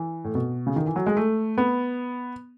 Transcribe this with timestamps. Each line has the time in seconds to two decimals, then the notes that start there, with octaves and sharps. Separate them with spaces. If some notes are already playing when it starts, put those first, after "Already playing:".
Already playing: E3
0.24 A2
0.35 B2
0.67 C#3
0.76 D#3
0.86 E3
0.96 F#3
1.07 G#3
1.17 A3
1.58 B3